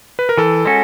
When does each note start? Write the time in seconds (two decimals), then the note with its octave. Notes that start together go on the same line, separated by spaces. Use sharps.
0.19 B4
0.29 A#4
0.37 E3 A4
0.65 G#3 C#4 F#4